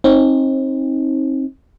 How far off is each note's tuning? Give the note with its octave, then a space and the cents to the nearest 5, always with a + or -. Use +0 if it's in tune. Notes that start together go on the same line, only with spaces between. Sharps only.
C4 +35 D#4 +20